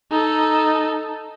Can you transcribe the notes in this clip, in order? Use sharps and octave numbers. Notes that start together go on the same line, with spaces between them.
D#4 A4